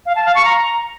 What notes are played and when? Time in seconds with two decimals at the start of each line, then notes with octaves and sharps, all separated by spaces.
0.06 F5
0.16 A5
0.25 F5
0.35 C#6
0.45 A#5